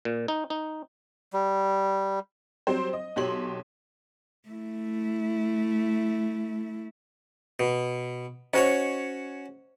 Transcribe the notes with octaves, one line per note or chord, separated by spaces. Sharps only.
A#2
D#4
D#4
G3
F#3 G3 C4 C5
D#5
B1 F#3 G4 C#5 C6 F#7
A3 E4
B2
C#4 F#4 C5 C#5 D#5